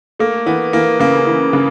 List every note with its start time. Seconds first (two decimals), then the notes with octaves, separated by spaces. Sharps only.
0.19 A3 A#3
0.46 E3 B3
0.73 E3 A#3
1.00 C#3 A#3
1.27 E3
1.53 C#3